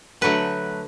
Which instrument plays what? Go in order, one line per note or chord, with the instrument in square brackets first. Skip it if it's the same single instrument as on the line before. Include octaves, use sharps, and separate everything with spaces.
[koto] D3 F#3 A3 B4